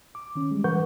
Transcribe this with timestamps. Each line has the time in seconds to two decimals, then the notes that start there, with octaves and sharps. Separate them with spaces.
0.15 D6
0.35 D#3 C#4
0.51 G3 G#3
0.64 E3 A#4 B4 F#5 C#6 G6